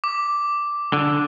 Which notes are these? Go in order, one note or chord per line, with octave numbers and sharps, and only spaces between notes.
D6
D3